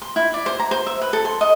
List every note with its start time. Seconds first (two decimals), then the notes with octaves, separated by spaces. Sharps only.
0.02 C6
0.16 E4
0.34 D5
0.46 C5
0.59 A#5
0.71 C5
0.87 E5
1.01 B4
1.13 A4
1.25 C6
1.41 D#5